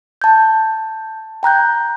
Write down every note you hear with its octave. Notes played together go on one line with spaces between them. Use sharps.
A5 G6
G5 A#5 F#6 G6